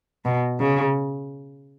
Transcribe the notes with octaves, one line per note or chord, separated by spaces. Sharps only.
B2
C#3